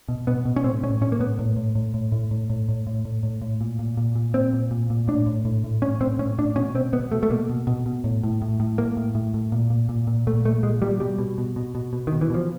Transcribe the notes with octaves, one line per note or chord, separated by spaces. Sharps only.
B2
B2 B3
B2
C#4
A2 C4
A2 C#4
A2 C#4
A#3
A2 B3
A2
A2
A2
A2
A2
A2
A2
A2
A2
A2
A2
A2
A#2
A#2
A#2
A#2
A#2 C4
A#2
A#2
A#2
A2 D4
A2
A2
A2
A2 C#4
A2 C4
A2 C#4
A2 D4
B2 C#4
B2 C4
B2 B3
B2 A3
A3
B2 A#3
B2
B2
B2
A2
A2
A2
A2
A2 A#3
A2
A2
A2
A#2
A#2
A#2
A#2
A#2 A3
A#2 A3
A#2 G#3
A#2 G3
B2 G3
B2
B2
B2
B2
B2
B2 D#3
E3
B2 F3